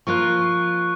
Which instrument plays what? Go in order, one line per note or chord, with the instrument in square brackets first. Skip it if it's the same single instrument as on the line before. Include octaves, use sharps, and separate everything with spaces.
[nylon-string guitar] F3 A#3 F4 [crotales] C#6 F#6